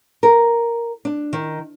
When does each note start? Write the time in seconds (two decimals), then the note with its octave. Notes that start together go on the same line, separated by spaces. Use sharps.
0.23 A#4
1.05 D4
1.33 D#3